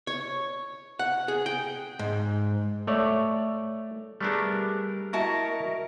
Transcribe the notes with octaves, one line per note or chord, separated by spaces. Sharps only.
C#5
F#5
G#4
G5
G#2
A3 C#5 D5
G3 A3 B3 D4 G#4 A#4 A5 F6
E4 F#4 A#4 D#5 A5 C#6